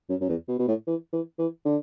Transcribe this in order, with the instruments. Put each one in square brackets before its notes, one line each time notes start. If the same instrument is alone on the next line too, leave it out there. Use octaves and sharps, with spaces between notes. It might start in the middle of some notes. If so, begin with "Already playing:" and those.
[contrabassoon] F#2
F#2
E2
B2
B2
A2
E3
E3
E3
D3